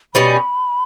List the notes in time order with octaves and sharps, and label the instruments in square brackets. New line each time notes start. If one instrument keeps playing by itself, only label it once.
[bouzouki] B2 G3 C#4 [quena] B5